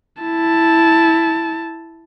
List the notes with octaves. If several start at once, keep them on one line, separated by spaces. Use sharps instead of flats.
E4 A5